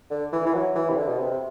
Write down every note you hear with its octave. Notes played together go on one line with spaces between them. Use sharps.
D3
E3
E3
F#3
E3
C3
D3
B2
C3
C3